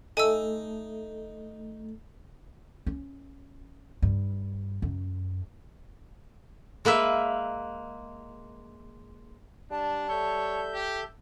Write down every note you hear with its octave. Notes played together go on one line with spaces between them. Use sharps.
A3 D#4 G#5 E6
C#4
G2
F#2
G#3 A#3 B4 E5
G3 D4 A5
A4 C#5 E5 G6
G4